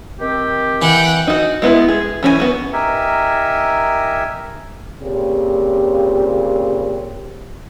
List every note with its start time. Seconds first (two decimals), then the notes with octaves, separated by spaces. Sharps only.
0.20 D#3 C4 G4
0.82 E3 F#5 G5
1.27 D#4 F#4
1.62 G#3 B3 E4
1.88 G#4
2.23 E3 C#4 G#4 G#5
2.40 B3 F#4
2.73 D#4 G4 A#4 E5 G#5
5.02 A#2 C#3 C4 G4